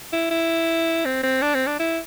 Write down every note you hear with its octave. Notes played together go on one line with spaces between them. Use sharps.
E4
E4
C4
C4
D4
C4
D4
E4